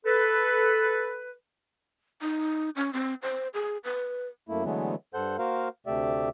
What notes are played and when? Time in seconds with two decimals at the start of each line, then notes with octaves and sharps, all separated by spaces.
0.06 A4 B4
2.22 D#4
2.76 C#4
2.93 C4
3.22 C5
3.54 G#4
3.84 B4
4.48 F#2 A3 A#3 E4
4.64 D3 E3 F#3 G#3 A3 B3
5.14 G2 A4 C5 F#5 G6
5.39 A#3 F#4 A#4 C5 F5
5.87 D2 C3 A3 G4 D5 E5